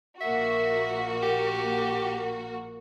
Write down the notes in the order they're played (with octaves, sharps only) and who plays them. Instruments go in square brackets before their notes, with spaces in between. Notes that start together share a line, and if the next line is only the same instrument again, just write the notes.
[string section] A#1 A#3 F#4 [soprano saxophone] E5
[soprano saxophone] G4